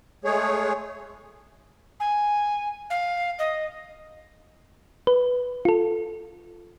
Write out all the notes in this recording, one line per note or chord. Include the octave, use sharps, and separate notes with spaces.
G#3 A3 G#4 C#5
G#5
F5
D#5
B4
F4 A4